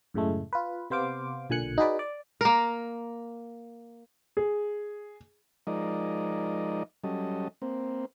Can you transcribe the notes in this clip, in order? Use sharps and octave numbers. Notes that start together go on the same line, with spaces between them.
F#2 A2 C#3 G#3 A3
F4 B4
C3 B3 C5 F5 D6
B1 A#2 D3 G#5 F#6 C#7
D#4 F#4 G#4 B4 D5
D5
A#3 A#4
G#4
F3 G#3 D#4 A#4 D5 D#5
F#3 G3 C#4 A4 D#5
A#3 C4